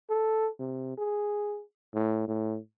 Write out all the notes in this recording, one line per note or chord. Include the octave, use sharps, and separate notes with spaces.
A4
C3
G#4
A2
A2